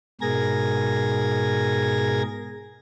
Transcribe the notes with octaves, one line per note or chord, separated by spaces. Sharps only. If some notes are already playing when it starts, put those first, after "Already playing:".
G#2 B2 G#4 A#4 G#6 A#6